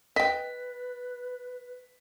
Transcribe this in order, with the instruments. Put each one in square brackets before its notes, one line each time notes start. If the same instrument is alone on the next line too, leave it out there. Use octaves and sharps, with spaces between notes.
[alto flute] B4 [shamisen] D#5 G5 [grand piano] B6